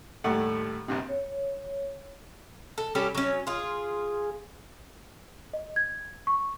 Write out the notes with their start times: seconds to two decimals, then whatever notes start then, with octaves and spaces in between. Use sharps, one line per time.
0.24 D#2 A2 G3 A3 F#5
0.88 A#1 G2 C3
1.09 C#5
2.78 A4
2.95 G3 C#4 G4 A4
3.15 F#3 C#4
3.47 F4 G#4
5.53 D#5
5.76 G#6
6.27 C#6